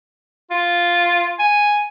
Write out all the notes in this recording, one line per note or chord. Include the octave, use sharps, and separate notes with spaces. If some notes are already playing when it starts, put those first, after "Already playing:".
F4
G#5